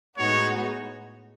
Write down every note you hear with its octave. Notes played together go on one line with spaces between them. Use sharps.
A2 G#3 B3 D#4 F#4 C#5